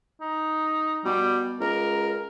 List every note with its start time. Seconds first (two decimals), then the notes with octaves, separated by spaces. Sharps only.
0.20 D#4
1.05 B2 G3
1.61 C#2 A#4